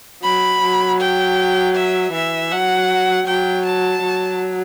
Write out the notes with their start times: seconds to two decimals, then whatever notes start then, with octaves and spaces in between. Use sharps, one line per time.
0.23 F#3 B5
0.62 F#3
1.00 G5
1.75 E5
2.13 E3 E5
2.51 F#3 F#5
3.27 F#3 G5
3.66 A5
4.03 F#3